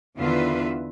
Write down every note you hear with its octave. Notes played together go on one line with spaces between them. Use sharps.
E2 D3 D#3 F4 B4 E5